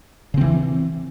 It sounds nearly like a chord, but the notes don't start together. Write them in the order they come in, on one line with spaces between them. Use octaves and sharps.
C#3 C4 E3